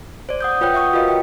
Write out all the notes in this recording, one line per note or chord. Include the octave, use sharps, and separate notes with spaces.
C5 D5
F#5 D#6 G6
F4 B4 C#5 G5 F#6 G6
E5 F#5 C#6 D#6
F4 F#4 A#4 B4 D#5 F5
G5